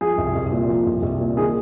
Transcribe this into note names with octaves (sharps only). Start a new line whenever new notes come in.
F3 G#4
C2
C2
A#2
F3
C2
C2
A#2
D#3 G#4